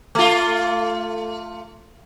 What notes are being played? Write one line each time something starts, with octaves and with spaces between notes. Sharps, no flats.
A3 F4